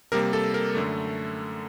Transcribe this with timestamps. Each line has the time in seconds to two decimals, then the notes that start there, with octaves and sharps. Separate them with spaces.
0.12 C3 G3 A#3 A#4
0.33 A4
0.54 A#4
0.75 F#2 D3 A3